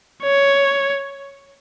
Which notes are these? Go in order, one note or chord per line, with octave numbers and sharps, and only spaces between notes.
C#5